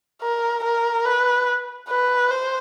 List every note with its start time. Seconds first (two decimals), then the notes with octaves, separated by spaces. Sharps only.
0.22 A#4
0.64 A#4
1.05 B4
1.89 B4
2.30 C5